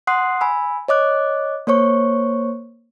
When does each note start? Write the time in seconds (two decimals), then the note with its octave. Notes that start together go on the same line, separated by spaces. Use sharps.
0.07 F#5 C6 D#6 F#6 C7
0.41 G#5 B5 E6
0.88 C#5 D#5 D6 F#6
1.67 A#3 C5 C#5 C#6